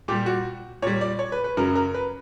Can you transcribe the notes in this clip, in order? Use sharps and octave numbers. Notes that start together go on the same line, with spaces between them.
A#2 G3 G4
F#4
A#2 G3 C#5
D5
C#5
B4
B4
F#2 C#3 F#3 A#4
A#4
B4